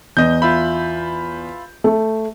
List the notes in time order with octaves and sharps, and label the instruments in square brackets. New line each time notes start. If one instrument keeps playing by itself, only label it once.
[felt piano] E2 [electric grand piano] D#5 G6
[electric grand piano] F4 E5 B5
[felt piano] A3